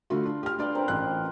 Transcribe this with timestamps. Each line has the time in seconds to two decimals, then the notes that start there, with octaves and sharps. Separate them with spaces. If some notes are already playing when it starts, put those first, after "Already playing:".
0.10 D3 A3 F4 F#4 B5
0.26 D4
0.43 G4 F6
0.59 D4 F4 B4 D5 G5
0.75 C4 A#4 B4
0.88 A1 F#6